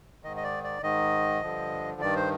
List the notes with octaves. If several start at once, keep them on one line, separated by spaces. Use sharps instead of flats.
G#2 D#3 D#5
D#5
D5
D5
G#2 D#3 D#5
G2 D3 F3
G2 D#3 D5
C5